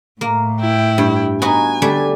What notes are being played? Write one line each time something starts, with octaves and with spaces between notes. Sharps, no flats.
A2 A#3
E4 G5
G2
B3 D#4 F#4 G#5
D3 G3 A3 D4